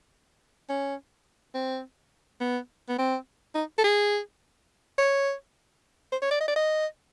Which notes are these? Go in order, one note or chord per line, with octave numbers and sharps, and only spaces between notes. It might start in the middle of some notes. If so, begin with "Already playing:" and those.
C#4
C4
B3
B3
C4
D#4
A4
G#4
C#5
C5
C#5
D5
D#5
D5
D#5